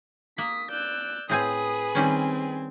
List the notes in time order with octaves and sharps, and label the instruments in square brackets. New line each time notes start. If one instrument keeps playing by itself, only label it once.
[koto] A#3 [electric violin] D#6 B6
[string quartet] D5 E6 [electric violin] F#6 G6
[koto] A2 C4 G#5 [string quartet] G#4 B4 [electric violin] D#6
[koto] D#3 G3 C#4 [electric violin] C4 G#5